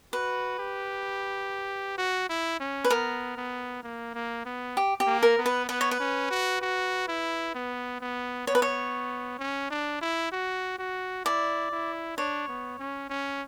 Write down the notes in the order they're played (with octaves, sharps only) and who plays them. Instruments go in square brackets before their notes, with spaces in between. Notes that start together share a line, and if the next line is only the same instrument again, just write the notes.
[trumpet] F#4 [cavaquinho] B4
[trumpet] G4
F#4
E4
C#4
[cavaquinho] B4
[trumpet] B3 [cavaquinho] A#4
[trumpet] B3
A#3
A#3
B3
[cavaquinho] G4
G4
[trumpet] A#3
[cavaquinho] A#4
[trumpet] B3
[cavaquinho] B4
[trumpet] B3 [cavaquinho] B4
[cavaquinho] C#5
B4
[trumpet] C#4
F#4
F#4
E4
B3
B3
[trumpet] B3 [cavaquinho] C#5
[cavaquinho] B4
C#5
[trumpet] C#4
D4
E4
F#4
F#4
[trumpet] E4 [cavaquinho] D5
[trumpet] E4
[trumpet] D4 [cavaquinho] C#5
[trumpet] B3
C#4
C#4